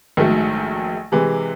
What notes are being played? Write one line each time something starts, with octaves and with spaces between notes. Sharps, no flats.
A#1 G#2 D#3 F#3 A3
C3 E3 G#3